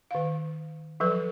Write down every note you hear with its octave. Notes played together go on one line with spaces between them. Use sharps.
D#3 F5
F3 F#3 A4 B4